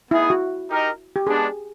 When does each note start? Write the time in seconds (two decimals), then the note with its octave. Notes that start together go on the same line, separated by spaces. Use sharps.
0.11 B3 D#4 E4 G#4
0.30 F#4
0.69 D#4 G4 A#4 D#5
1.16 G4
1.27 G#3 B3 D4 G#4